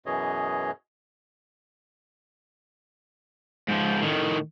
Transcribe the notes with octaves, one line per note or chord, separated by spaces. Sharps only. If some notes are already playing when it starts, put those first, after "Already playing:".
F#2 B2 E3 G#4 C#5 D#5
G#2 F3
A2 D#3